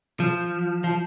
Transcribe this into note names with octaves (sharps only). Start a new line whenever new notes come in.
F3
F3